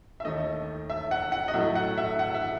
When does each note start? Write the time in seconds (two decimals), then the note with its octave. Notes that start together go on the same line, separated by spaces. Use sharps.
0.20 E5
0.25 D#2 D#3 A3 D#5
0.90 E5
1.11 F#5
1.32 F#5
1.48 D#5
1.54 A2 F#3 A3 E5
1.75 F#5
1.97 E5
2.19 F#5
2.34 E5